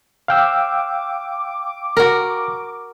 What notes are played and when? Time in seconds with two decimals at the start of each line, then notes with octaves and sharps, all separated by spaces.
0.28 F5 G5 D6 E6
1.97 F#4 A#4